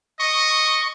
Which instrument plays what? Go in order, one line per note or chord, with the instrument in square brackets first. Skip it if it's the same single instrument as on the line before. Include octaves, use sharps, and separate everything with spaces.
[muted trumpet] D#5 [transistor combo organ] C#6